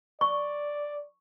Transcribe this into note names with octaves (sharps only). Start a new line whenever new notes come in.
D5 C#6